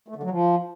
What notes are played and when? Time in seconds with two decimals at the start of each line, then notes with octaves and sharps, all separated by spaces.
0.08 A3
0.16 D3
0.23 F#3
0.30 F3